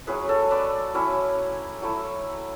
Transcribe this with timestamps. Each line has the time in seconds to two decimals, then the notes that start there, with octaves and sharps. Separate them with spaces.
0.07 F#3 C#4 E4 G#4 B4
0.29 A4 C#5
0.51 B4 D5
0.94 F#3 C#4 E4
1.82 F#3 A3 E4